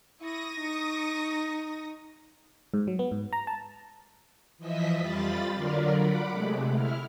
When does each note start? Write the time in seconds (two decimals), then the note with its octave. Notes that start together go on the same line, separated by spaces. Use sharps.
0.21 E4 C#6 D#6 A#6
0.60 D#4
2.74 G#2
2.88 F#3
2.99 B3
3.11 G#2
3.33 A#5
3.47 A5
4.58 E3 F3 D#5 E5 B6
4.97 F2 G3 F4 B5 A6
5.55 D3 F#3 D4 F4 A#4 D5
5.95 F#5 B5 D6
6.31 C3 G#3 A3
6.73 E4 F6